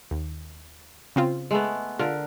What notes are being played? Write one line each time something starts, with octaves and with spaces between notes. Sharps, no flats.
D#2
C#3 C4 F4
G#3 A3 B3
D3 F4 A#4